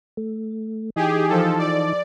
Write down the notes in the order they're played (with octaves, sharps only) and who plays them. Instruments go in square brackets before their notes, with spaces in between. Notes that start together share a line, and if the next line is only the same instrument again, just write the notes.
[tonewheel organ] A3
[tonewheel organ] E3 D#4 [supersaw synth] G4 G#4
[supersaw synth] F3 A4
D5